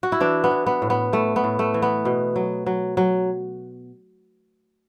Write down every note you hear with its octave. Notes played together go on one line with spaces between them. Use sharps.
F#4
E4
E3 D4
B3
E3
B3
A2
B3
A2 A3
B3
A2
A3
E3
B3
B2
F#3
F#3
F#3